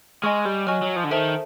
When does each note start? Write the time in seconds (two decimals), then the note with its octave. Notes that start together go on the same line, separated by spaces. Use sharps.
0.23 G#3 D#5 G#5 C#6 F6
0.45 G3
0.66 F#3 D#5 G#5 C#6 F6
0.82 F#3
0.96 F3
1.04 D3
1.11 D#3 A4 C5 E5 A5